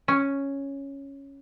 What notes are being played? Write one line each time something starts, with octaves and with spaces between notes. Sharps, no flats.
C#4